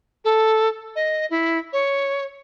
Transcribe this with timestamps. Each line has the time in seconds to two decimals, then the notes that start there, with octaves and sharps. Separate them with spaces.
0.25 A4
0.96 D#5
1.30 E4
1.73 C#5